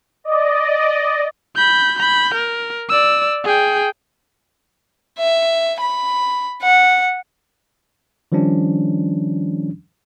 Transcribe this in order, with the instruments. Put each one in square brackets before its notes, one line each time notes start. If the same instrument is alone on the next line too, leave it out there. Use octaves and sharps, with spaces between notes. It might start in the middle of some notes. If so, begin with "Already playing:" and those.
[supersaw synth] D5 D#5
[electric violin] B5 G6
B5 G6
A#4
D5 E6
G#4 G5
[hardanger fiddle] E5
B5
F#5
[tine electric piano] D#3 F3 G3 C#4 D4